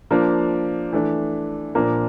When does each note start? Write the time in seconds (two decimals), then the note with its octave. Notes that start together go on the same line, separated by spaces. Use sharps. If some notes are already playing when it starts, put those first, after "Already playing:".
0.11 F3 A#3 D4
0.93 E3 A3 D4
1.75 A#2 F3 A#3 D4